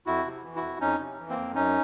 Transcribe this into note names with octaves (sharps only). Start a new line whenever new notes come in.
F2 E4 F#4
C3
E3
E4 F#4
F2
F2 C#4 D#4
C3
E3
A#3 C4
F2
F#2 C#4 D#4